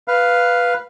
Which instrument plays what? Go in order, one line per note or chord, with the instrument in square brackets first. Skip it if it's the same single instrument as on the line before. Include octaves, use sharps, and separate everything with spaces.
[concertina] B4 F5